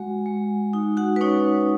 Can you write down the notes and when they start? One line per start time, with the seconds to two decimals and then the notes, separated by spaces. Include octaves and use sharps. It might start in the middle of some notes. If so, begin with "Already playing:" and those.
Already playing: G#3 F#4 F#5
0.26 G#3
0.73 D#4
0.97 F#4 F#5
1.16 B4
1.21 C#4 D#4 C#5